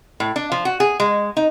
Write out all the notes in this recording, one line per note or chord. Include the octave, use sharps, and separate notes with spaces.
A2
D4
F3
F#4
G#4
G#3
D#4